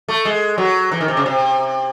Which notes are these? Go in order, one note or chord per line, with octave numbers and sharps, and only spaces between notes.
A3
G#3
F#3
E3
D#3
C3
C#3
C3